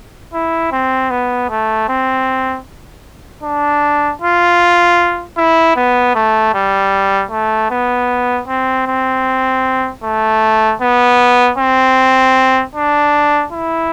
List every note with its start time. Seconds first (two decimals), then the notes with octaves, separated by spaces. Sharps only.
0.33 E4
0.72 C4
1.10 B3
1.49 A3
1.89 C4
3.43 D4
4.22 F4
5.37 E4
5.76 B3
6.15 A3
6.54 G3
7.31 A3
7.70 B3
8.47 C4
8.87 C4
10.04 A3
10.81 B3
11.58 C4
12.75 D4
13.52 E4